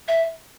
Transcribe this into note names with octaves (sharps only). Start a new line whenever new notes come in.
E5